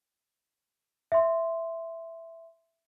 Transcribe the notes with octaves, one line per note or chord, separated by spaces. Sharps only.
E5 C6